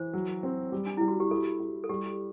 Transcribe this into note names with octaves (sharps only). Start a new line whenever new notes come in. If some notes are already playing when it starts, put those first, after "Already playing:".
Already playing: E3 C5
F#3
C4
G3
D4
G3 E4
F#4
G4
E4 A4
E4
A4
G3 G4